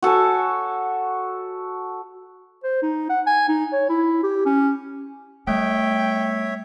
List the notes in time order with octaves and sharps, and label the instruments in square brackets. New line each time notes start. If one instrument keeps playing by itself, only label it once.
[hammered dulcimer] F#4 A4 C#5 G#5
[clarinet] C5
D#4
F#5
G#5
D#4
C#5
E4
G4
C#4
[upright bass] G3 B3 [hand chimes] A3 [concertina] C#5 E5 [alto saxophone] G5